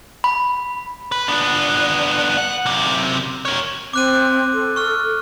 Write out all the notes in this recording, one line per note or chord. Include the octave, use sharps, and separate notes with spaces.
B5
B4
B3 D4
F#5
F#2 C3
A#4 C#5
C4 D6 F#6 D#7
A4
C#6 F6